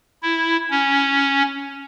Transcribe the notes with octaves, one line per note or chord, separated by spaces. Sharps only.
E4
C#4